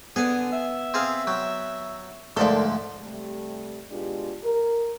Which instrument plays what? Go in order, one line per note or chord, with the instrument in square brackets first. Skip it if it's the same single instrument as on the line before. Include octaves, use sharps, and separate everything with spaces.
[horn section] D3 [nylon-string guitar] B3 [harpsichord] G#4 G#5
[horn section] E5
[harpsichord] C4 G#4 F5
F#3 G5
[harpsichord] D2 G#2 F3 [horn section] A#3 [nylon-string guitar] A4 D5
[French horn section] C3 G3 A3
B2 G#3 D4 F4 G4
A#4